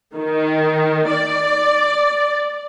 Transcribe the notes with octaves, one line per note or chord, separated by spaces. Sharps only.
D#3
D5